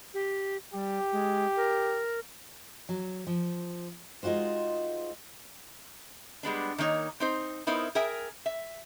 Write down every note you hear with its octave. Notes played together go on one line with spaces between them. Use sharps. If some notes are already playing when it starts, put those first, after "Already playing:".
G4
G3 G4
G#3
A#4
F#3
F3
G#3 D#4 F4 F#4 C5
G3 G#3 B3 D4
D#3 A#3 D#4 C#5
C4 D#4 C5
B3 D#4 E4 A#4 C5
G#4 A#4 E5 G5
E5